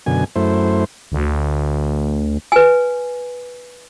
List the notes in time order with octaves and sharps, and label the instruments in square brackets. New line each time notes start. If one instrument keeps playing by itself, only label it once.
[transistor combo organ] F#2 B2 D3 G#5
F#2 A3 E4 C5
[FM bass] D2
[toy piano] B4 G#5